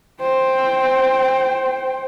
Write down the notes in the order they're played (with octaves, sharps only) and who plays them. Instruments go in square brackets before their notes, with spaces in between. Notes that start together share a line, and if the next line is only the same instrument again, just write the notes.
[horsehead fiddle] C5 G5